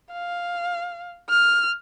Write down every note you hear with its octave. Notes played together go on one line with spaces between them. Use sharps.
F5
F6